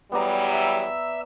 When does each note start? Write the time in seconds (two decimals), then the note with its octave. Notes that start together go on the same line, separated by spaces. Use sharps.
0.12 E2 F#3 G3 B3 D5 A#5
0.51 E5 E6